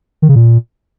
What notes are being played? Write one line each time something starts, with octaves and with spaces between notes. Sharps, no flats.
D#3
C#3
A#2